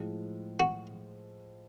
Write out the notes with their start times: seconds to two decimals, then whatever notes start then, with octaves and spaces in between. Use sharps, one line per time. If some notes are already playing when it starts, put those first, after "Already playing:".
Already playing: A2 F3 G#3
0.60 F#4